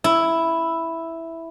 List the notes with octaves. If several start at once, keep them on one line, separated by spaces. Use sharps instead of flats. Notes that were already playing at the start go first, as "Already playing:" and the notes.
E4